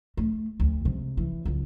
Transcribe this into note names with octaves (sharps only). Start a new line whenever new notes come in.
A3
D2
C3 G#3
E3
C#2 F#2